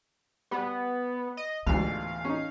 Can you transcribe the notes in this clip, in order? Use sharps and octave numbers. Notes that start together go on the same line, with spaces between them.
G3 B3
D#5
A1 D2 G#2 E3 B3 F5
C#4 D#4